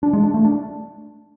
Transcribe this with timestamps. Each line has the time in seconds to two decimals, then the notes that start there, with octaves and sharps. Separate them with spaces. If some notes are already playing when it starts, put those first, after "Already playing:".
0.03 D4
0.13 G#3
0.24 D4
0.34 A3
0.45 D4